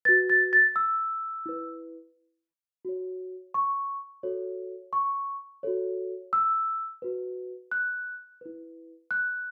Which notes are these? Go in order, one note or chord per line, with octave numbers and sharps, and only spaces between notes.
F#4 B4 A6
A6
A6
E6
E4 B4
F#4 C#5
C#6
F#4 A4 C#5
C#6
F#4 A4 C#5
E6
F#4 B4
F#6
E4 B4
F#6